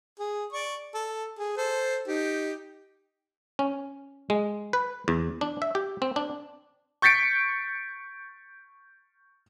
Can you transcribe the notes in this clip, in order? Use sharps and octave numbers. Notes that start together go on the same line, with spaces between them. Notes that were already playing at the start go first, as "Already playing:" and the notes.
G#4
D5 C#6
A4
G#4
A4 C5
D#4 G4
C#4
G#3
B4
E2
D4
E5
G4
C4
D4
C#6 G6 A6 B6 C#7 D7